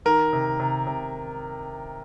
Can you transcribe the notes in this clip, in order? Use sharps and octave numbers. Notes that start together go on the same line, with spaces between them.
D#3 A#4
C3
C3
C3